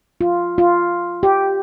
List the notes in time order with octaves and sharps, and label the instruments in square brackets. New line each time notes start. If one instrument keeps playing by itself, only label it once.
[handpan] F4
F4
G4